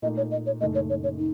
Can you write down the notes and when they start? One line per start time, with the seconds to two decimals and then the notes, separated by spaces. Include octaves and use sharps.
0.02 A#2 A3 D#4 D#5
0.17 C#5
0.31 D#5
0.46 C#5
0.60 F#1 F#2 D#3 A3 D#5
0.75 C#5
0.89 C#5
1.03 C#5
1.18 D#4